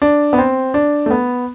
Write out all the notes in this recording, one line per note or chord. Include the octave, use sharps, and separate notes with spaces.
D4
B3
C4
D4
A3
B3